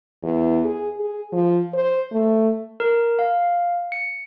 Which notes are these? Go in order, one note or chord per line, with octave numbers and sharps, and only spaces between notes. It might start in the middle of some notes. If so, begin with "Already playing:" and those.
E2
G#4
G#4
F3
C5
A3
A#4
F5
C#7